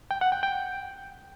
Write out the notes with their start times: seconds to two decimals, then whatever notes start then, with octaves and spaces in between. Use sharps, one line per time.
0.11 G5
0.21 F#5
0.32 G5
0.43 G5